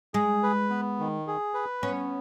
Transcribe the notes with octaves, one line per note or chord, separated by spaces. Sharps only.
G#3 G#4
B4
B3
D#3
G#4
B4
B3 C#4